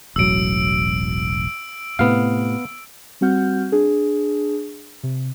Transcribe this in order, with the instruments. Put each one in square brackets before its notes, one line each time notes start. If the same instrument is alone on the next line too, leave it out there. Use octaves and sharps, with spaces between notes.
[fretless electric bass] E1 A1 F#3 [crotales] E6 D7
[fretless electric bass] A2 C3 [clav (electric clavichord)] B3 F5
[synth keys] G3 C4 F#4 F#5 F6 G6
D4 G#4
C3